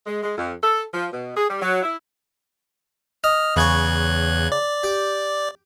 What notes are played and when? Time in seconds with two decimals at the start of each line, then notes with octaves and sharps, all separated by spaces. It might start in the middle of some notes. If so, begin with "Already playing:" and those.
0.06 G#3
0.23 G#3
0.38 F2
0.63 A4
0.94 F3
1.13 B2
1.37 G#4
1.50 G3
1.62 F#3
1.83 E4
3.24 D#5 F6
3.56 E2 C#3 C#5 F#6 G#6
4.52 D5
4.83 G4